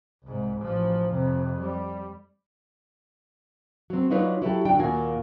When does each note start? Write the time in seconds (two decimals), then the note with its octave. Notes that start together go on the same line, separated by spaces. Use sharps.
0.24 C2 G#2
0.58 A1 F3
1.11 F2 C3
1.60 G3
3.90 F#3 C4
4.10 F#3 D4 D#4 F4 B4 C#5
4.42 F#3 E4 G4 A4
4.65 D3 F#3 D4 G5
4.79 D#2 A#2 A#3 F#4 G#5